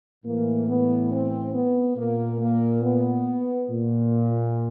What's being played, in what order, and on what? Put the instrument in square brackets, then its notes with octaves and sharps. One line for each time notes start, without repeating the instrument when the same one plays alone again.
[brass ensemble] A2 E3 A#3
B3
C4
B3
A#2 A#3
A#3
B3
A#2